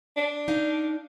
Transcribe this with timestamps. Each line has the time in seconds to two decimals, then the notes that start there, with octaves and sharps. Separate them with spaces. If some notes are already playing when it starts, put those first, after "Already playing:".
0.16 D4
0.48 D#4 F5